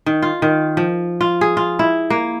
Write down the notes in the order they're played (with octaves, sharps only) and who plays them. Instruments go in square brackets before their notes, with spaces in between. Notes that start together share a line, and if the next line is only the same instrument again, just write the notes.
[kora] D#3
F4
D#3
F3
F4
G#4
F4
E4
A#3